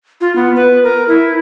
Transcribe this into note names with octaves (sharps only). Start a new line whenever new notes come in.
F4
B3
B4
A#4
E4